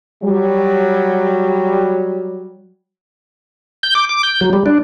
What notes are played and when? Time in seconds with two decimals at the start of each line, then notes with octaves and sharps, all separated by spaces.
0.24 F#3 G3
3.83 G6
3.95 D6
4.09 D6
4.23 G6
4.41 F#3
4.53 G3
4.66 D4